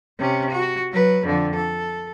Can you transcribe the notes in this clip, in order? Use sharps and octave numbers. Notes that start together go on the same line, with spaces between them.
C3 C#4
F#4
F#3 B4
F2 D3
A4